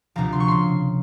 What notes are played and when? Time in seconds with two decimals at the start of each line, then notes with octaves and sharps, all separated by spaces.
0.16 D2 C3 F3 A#5
0.33 C6
0.40 C#6
0.48 C#3 C6